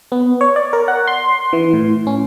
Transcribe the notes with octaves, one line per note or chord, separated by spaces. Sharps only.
B3
C#5
D5
A#4
F#5
C6
E3
A2
C#4